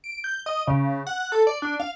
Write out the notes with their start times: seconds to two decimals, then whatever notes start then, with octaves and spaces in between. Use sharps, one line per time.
0.04 D7
0.24 G6
0.46 D#5
0.67 C#3
1.07 F#5
1.32 A4
1.47 D5
1.62 D4
1.80 F5